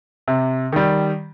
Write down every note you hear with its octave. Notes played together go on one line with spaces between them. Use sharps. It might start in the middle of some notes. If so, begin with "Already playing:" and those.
C3
D#3 G3